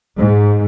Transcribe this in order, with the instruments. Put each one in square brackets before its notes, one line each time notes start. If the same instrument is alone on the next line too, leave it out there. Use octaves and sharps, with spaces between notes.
[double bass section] G#2